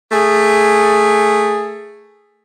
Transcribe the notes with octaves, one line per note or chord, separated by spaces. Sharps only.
A3 G#4